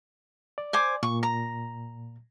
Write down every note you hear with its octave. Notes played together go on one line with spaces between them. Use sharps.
D5
C5 G#5 D6
A#2 C#6
A#5